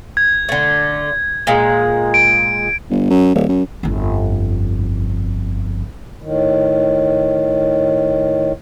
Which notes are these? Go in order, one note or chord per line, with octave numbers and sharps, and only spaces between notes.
G#6
D3 A3
A#2 G#3
D7
G1
F#2
D1
F#2
G1 F2
A2 D#3